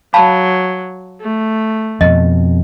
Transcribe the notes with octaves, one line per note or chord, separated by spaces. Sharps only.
F#3 F5 A5 B5
A3
F2 B2 D#5